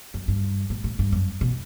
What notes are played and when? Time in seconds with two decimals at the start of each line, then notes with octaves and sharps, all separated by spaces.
0.14 F#2
0.28 G2
0.70 A2
0.84 A2
0.99 G2
1.12 F#2
1.41 B2